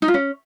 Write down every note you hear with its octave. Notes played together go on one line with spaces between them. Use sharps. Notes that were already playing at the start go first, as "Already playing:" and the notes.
D#4
F4
C#4